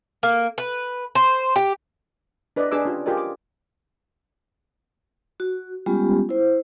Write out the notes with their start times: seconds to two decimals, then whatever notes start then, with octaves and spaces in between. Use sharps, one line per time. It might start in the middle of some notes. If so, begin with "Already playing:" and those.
0.23 A#3
0.58 B4
1.15 C5
1.56 G4
2.56 D4 B4 D5 D#5
2.71 D4 G#4 B4 D6 E6
2.85 C#4 F4 G4
3.05 F4 G4 G#4 A#4 D5 D#5
3.17 D6
5.40 F#4
5.86 G3 G#3 B3 C#4 F4 G4
6.29 E4 C5